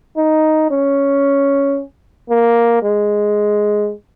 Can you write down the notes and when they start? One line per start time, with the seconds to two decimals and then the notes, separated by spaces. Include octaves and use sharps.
0.17 D#4
0.71 C#4
2.30 A#3
2.83 G#3